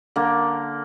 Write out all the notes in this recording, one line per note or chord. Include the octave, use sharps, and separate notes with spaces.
D3 A#3